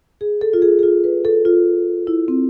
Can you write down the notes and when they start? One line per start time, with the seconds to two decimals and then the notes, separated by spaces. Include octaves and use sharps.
0.21 G#4
0.41 A4
0.53 F4
0.62 G#4
0.79 G#4
0.83 F4
1.04 B4
1.25 A4
1.45 F4
2.07 E4
2.28 C4